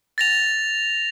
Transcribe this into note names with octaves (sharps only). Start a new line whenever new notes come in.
A6 A#6 F7